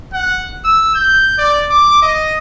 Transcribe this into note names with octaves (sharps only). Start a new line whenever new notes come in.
F#5
E6
G6
D5
D6
D#5